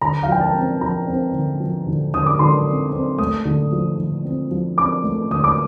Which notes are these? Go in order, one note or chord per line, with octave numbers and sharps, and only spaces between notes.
D3 A#5
F5
F3 G5
A5
C4
F3 A#5
C4
D3
F3
D3
D3 D#6
D6
D3 C6
C4
C4
A3 D#6
D3
F3
D3
C4
F3
C4 D6
A3
D3 D#6
D6